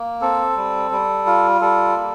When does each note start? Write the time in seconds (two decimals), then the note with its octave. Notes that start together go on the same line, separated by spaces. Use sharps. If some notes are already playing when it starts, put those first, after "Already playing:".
Already playing: A#3
0.21 C4 A4
0.56 G3
0.91 G3
1.26 F4
1.61 G3 A4
1.96 A#3